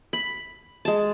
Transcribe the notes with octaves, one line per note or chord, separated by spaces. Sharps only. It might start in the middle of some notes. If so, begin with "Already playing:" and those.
B5
G#3 A5